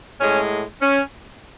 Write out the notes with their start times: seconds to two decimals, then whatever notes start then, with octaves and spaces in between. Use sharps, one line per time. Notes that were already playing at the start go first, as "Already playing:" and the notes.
0.19 A2 G#3 C#4
0.81 C#4